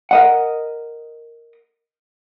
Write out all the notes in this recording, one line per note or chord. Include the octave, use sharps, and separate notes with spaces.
A#4 D#5 F#5